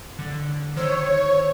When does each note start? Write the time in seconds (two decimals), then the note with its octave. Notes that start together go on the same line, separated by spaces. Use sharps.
0.19 D3
0.76 D#3 C5 C#5 E6